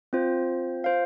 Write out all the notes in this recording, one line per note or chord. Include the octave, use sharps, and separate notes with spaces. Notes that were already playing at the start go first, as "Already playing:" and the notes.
C4 F4 C5
F4 C5 F5